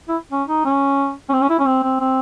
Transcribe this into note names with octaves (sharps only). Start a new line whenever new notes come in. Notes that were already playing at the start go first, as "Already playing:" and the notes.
E4
C#4
D#4
C#4
C#4
C4
C#4
E4
C#4
C4
C4
C4